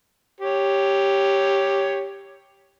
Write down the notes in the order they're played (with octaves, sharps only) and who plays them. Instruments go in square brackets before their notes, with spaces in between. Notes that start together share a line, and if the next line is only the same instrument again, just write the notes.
[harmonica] G4 C#5